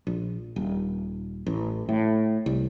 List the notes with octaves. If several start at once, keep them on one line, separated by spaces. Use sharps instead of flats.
A#1
D#1
A1
A2
C2